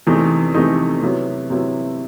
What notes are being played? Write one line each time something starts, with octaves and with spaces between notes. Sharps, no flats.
E2 C3 E3 A3 D#4
E2 C3 E3 A3 D#4
C3 F#3 B3 E4
C3 F#3 B3 E4